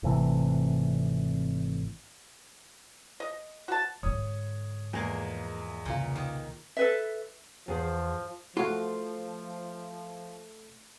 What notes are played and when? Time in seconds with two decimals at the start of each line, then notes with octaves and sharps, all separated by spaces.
0.03 G#1 C3 E3 A3
3.20 D#5
3.68 F#4 A5
4.03 G#2 D3 C#5 D#6
4.93 E2 F3 G#3 A#3 G#5
5.85 C2 A#2 C#3 F4
6.16 D#3
6.77 A4 B4 E5
7.68 E2 F3 G#4 C5
8.57 F3 A3 F4 F#4